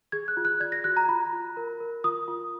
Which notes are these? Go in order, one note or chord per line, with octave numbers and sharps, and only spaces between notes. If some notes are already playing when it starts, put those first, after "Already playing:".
G#4 G#6
F#6
F4
F#6
D5 G#6
A#6
F#4 F#6
A#5
F4 B5
F4
A#4
A#4
F4 D#6
F4